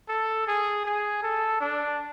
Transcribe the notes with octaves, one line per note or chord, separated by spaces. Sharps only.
A4
G#4
G#4
A4
D4